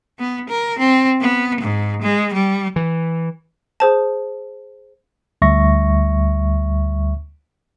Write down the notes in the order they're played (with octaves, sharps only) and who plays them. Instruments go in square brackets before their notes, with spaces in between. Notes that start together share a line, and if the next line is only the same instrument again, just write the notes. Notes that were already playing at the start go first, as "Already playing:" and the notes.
[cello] B3
A#4
C4
B3
G#2
G#3
G3
[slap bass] E3
[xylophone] G#4 C5 A5
[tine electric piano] D2 G3 E5 C#6 A#6